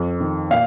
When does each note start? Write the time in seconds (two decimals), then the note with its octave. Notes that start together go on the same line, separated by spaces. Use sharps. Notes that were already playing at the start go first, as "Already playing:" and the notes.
Already playing: F2
0.20 D#3
0.50 A#2 F5